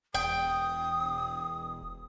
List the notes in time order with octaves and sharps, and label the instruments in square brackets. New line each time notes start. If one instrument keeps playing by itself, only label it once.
[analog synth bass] E1 [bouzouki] G5 [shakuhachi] D#6